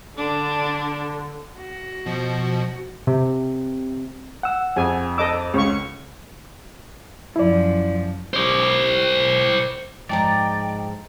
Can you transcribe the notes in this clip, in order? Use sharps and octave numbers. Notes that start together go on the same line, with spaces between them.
D3 D4
F#4
B2 F3
C3
F#5 E6
F2 G#4 G#5
A4 D#5 D6 E6
C#2 C#5 C#6
F#2 F3 E4 D5
C5 D5
G#2 F3 G#3 D#4 D5 G5 A5 A#5